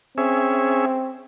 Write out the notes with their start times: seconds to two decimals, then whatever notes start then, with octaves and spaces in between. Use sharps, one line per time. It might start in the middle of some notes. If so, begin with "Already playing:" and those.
0.18 C4 C#4 G#4 E5